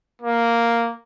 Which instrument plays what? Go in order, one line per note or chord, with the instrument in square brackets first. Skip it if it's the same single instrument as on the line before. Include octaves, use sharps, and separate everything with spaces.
[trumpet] A#3